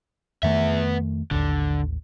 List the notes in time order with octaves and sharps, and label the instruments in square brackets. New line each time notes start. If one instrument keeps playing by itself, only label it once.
[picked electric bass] F2 D#3 A3 [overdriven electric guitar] B3 E5
[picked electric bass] A1 D#2 [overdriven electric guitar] D3